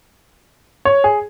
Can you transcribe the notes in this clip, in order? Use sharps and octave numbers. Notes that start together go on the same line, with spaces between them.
C#5
G#4